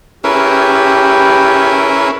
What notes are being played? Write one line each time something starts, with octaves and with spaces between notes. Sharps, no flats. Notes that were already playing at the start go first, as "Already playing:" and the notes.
C#4 E4 G4 G#4 A#4 B4